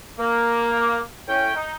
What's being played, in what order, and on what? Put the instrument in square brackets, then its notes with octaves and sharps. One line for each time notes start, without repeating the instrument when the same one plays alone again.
[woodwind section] A#3
A2 C#4 G5
D#4